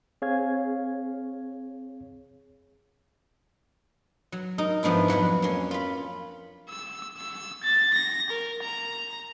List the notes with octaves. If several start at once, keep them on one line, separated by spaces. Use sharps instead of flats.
C4 G#4 C#5 F5 G#6
F#3
D#4 A#4
G#2 F3 B3 D4 E4
F2 F#3 B4 F#5
A#3 C#4 C#5
F4 B5
E6
E6
A6
A#6
A#4
A#5